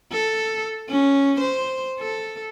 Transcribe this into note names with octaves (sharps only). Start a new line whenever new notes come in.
A4
C#4
C5
A4